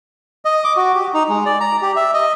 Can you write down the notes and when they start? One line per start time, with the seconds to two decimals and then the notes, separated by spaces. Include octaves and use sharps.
0.45 D#5
0.64 D6
0.77 F#4
0.95 G4
1.14 D#4
1.29 G#3
1.46 D5
1.60 A#5
1.82 G4
1.96 E5
2.14 D#5